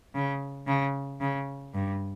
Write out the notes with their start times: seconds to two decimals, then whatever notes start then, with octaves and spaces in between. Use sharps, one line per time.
0.15 C#3
0.67 C#3
1.21 C#3
1.74 G2